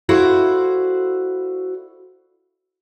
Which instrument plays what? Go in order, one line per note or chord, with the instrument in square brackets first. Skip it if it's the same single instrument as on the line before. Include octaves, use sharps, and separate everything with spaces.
[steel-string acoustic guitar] E4 F#4 A4 C5 D5 F5